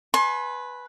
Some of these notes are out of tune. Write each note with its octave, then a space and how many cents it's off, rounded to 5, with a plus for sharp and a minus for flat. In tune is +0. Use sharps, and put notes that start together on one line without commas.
B4 +0 G#5 +30 C6 +40